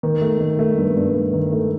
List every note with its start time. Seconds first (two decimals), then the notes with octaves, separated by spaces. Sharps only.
0.03 D#3
0.22 A3
0.40 D#3
0.59 A3
0.78 G2
0.97 G2
1.14 A3
1.33 D#3
1.52 A3